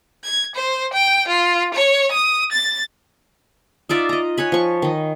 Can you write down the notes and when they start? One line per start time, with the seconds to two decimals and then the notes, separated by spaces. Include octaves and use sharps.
0.24 G#6
0.56 C5
0.94 G5
1.28 F4
1.74 C#5
2.12 D#6
2.52 A6
3.89 D#4 F4 D5 E5
4.09 D#5 A#5
4.38 C#5 F#5 G#5 B5
4.52 F3 C#6
4.82 D#3 D#5